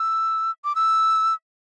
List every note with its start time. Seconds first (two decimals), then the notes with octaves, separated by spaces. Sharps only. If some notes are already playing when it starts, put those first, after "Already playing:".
Already playing: E6
0.65 D6
0.75 E6